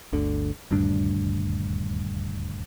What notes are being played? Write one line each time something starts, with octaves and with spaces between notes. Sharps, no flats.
G1 D2 D3
D#1 D2 G2 D4